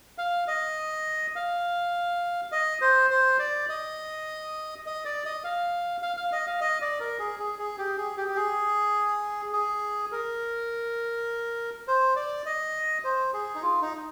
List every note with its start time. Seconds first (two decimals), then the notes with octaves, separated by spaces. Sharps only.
0.18 F5
0.48 D#5
1.36 F5
2.52 D#5
2.81 C5
3.10 C5
3.39 D5
3.69 D#5
4.86 D#5
5.05 D5
5.25 D#5
5.44 F5
6.03 F5
6.17 F5
6.33 D#5
6.47 F5
6.61 D#5
6.81 D5
7.00 A#4
7.19 G#4
7.40 G#4
7.59 G#4
7.78 G4
7.98 G#4
8.17 G4
8.28 G4
8.36 G#4
9.53 G#4
10.12 A#4
11.88 C5
12.16 D5
12.46 D#5
13.04 C5
13.34 G#4
13.55 D#4
13.63 F4
13.82 D#4